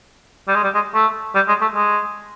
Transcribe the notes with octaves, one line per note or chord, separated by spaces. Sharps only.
G3
G#3
G3
G#3
A3
G3
G#3
A3
G#3